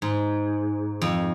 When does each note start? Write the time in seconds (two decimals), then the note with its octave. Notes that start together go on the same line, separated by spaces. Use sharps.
0.02 G#2
1.02 F2